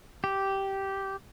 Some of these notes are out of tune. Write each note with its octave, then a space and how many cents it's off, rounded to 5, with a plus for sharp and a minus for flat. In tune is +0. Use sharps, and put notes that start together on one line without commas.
G4 -10